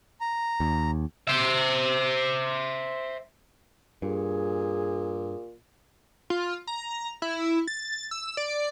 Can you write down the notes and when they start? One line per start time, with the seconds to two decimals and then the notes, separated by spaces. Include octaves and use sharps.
0.21 A#5
0.60 D#2
1.27 C5 E5
4.02 G2 A#2 G#4
6.30 F4
6.67 A#5
7.22 E4
7.67 A6
8.11 E6
8.37 D5